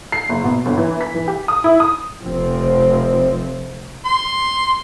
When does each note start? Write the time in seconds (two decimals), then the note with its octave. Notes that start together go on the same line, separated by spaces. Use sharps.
0.12 C7
0.29 F#1
0.44 B2
0.66 G1
0.78 E3
1.01 B6
1.14 E3
1.28 G4
1.48 D#6
1.64 E4
1.80 D#6
2.21 F1 F3 C4
4.05 C6